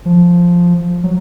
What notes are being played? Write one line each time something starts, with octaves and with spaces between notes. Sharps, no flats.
F3
F#3